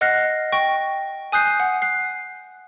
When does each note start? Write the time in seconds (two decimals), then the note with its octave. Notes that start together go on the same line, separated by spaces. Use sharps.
0.01 D#5 F#5 F6 F#6 A#6 C7
0.52 G5 C#6 A#6 D7
1.32 G#5 D#6 F#6 G6 C7
1.60 F#5
1.82 F#6 C7